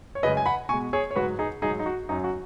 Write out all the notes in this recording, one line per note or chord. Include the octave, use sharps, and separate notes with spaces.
C#5
F#2 C#3 G#3 B4 D#5
G#5
F#5 B5
B2 G#3 G#5 C#6
G#4 C#5
C#5
G#2 F#3 F#4 B4
D#4 G#4
G#2 F#3 D#4 G#4
D#4
F#4
F#2 F#3 D#4
F#4